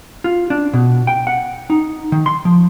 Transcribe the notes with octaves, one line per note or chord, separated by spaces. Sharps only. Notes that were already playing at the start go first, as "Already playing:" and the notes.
F4
D4
B2
G5
F#5
D#4
D#3
C6
F3